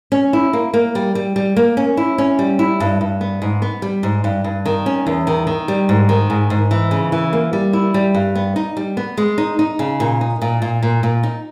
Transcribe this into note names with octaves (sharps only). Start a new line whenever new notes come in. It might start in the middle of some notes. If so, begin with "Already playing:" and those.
C#4
E4
A#3
A#3
G3
G3
G3
A#3
C#4
E4
C#4
G3
E4
G2
G2
B3
G#2
B3
G3
G#2
G2
G2
D#3
C#4
E2
D#3
D#3
G3
G#2
D#3
G#2
G#2
E3
C#3
E3
A#3
G3
E4
G3
G2
B3
D#4
G3
B3
G#3
D#4
D#4
C#3
A#2
D#4
A#2
A#2
A#2
A#2
D#4